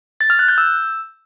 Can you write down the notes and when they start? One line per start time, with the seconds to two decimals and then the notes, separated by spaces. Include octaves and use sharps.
0.21 A6
0.30 F6
0.39 F#6
0.48 G6
0.58 E6